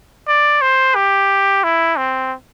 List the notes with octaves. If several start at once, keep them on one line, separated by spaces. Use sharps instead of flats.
D5
C5
G4
E4
C4